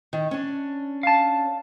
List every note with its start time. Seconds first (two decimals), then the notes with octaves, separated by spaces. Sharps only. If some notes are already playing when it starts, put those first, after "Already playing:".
0.13 D#3
0.31 C#4 D4
1.03 F5 A5